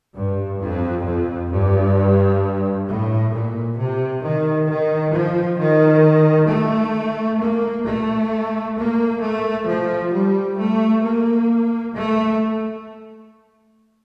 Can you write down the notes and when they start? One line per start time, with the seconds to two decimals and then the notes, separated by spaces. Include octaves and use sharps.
0.15 G2
0.61 F2
1.06 F2
1.51 G2
2.87 A2
3.33 A#2
3.78 C3
4.24 D#3
4.69 D#3
5.15 F3
5.60 D#3
6.50 A3
7.42 A#3
7.87 A3
8.78 A#3
9.23 A3
9.68 F3
10.14 G3
10.60 A3
11.04 A#3
11.95 A3